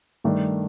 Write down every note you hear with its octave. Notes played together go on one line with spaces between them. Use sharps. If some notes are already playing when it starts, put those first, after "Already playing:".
G2 D#3 A3 D4